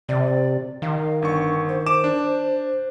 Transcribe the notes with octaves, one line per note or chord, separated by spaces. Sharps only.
C3 D5
D#3 F5
G1 D4 C#6
C5
D6 E7
D4